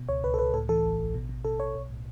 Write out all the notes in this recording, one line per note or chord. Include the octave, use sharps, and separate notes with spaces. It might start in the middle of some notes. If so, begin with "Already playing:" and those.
Already playing: B2
C#2 C#5
C#2 B4
A4
C#2 B4
A2 A4
E3 A4
A1
A1
B2
B2
B2 A4
B2 C#5
B1
A2